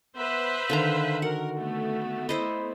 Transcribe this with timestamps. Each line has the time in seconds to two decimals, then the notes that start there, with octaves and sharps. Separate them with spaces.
0.16 B3 B4 C5 E5
0.70 D3 D#3 F5 A#5
1.22 F#4 A#4 F#5
1.58 A3 B3
2.29 E4 C5 D#5 B5